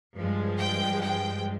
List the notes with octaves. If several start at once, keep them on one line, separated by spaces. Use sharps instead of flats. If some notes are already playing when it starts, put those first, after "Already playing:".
G2 F3 G#3
G5
G5